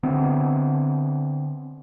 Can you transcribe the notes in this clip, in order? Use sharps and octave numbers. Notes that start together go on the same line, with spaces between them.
D3 B3 C4